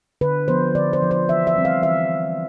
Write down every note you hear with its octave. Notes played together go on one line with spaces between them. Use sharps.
D3 B4
F3 B3 C5
D3 D5
C5
F3 B3
C5
E3 E5
E5
G3 C4
F5
E3 E5